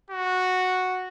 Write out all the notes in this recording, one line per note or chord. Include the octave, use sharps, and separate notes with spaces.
F#4